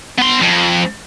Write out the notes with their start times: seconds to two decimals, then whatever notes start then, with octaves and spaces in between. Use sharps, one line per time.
0.19 B3 C6
0.42 F2